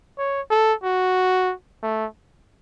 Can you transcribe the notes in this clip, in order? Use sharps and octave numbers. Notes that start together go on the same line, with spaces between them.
C#5
A4
F#4
A3